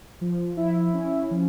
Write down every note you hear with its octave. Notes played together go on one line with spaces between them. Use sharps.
F3
E4
C#4
F3